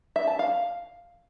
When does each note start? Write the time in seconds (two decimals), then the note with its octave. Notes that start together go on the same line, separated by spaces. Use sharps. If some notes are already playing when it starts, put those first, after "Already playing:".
0.16 E5
0.27 A5
0.39 F5